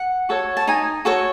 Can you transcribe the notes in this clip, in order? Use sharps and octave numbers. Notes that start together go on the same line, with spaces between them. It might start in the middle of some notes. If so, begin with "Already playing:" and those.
Already playing: F#5
F#4 A4 C#5
A5
D#4 G#5
F#4 A4 C#5